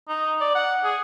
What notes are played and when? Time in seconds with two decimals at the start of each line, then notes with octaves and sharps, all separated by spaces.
0.09 D#4
0.40 D5
0.55 F#5
0.84 G#4